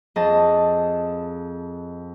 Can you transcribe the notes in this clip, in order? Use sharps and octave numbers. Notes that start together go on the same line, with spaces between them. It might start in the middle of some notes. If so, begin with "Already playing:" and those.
F2 G#4 D#5 A5